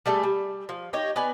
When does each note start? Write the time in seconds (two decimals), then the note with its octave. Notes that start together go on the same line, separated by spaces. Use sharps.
0.06 G3 A3 G#4 A4
0.23 G3
0.69 F3
0.93 D#4 G4 C#5 D#5
1.16 B3 B4 D5 G#5